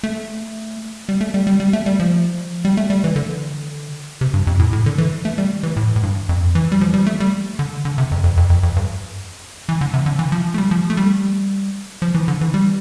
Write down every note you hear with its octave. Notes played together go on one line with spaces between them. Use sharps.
A3
G3
A3
G3
G3
G3
A3
G3
F3
G3
A3
G3
E3
D3
C3
G2
F2
A2
A2
D3
E3
A3
G3
E3
A2
A2
G2
F2
E3
G3
F3
G3
A3
G3
D3
D3
C3
F2
F2
F2
F2
F2
G2
E3
D3
C3
D3
E3
F3
A3
G3
F3
A3
G3
F3
E3
D3
E3
G3